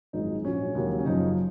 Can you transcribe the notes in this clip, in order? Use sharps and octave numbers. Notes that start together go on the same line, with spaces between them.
G#1 F#2 F3 G#3 D#4
A#1 G#2 F#3 C#4
D#2 C#3 F#3 A#3
C#4
F#1 F#2 C#3 F3 D#4